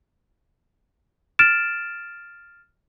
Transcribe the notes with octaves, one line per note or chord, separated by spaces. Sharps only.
F6 A6 D7 E7